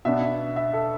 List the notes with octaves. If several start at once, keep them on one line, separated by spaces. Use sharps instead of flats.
B2 B3 D4 E5
E5
A4